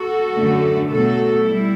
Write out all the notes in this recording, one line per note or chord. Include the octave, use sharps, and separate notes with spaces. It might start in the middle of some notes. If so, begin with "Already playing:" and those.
Already playing: F#4 A4
F#2 D3 A3
B2 F#3 A3 F#4 A4
G3 E4